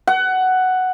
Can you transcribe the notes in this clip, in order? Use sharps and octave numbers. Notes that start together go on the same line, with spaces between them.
F#5